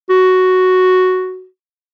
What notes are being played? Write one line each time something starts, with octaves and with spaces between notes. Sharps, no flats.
F#4